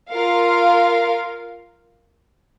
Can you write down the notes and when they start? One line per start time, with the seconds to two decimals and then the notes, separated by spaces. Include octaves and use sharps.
0.11 F4 A#4 F5